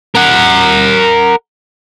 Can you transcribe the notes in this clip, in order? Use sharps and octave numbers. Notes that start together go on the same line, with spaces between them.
A#4 F#5